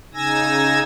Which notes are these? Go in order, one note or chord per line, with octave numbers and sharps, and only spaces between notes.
C#3 D#4 G#5 E6 G#6 A#6